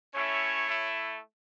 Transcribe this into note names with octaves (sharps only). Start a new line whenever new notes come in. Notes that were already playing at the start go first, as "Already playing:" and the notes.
A3 C#4 E4 C#5
A3 E4